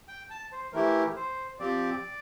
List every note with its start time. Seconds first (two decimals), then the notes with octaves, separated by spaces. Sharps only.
0.08 G5
0.30 A5
0.52 C5
0.73 E3 A3 E4 G4 A#4
1.16 C5
1.59 F3 C4 G4 D5